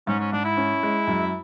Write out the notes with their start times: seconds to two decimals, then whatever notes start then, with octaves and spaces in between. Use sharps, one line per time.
0.07 G#2 C#4
0.20 C#4
0.32 G#2 D4
0.45 E4
0.57 C#4
0.83 G#3
1.07 F#2